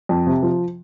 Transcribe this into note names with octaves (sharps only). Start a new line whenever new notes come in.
F2
C3
F3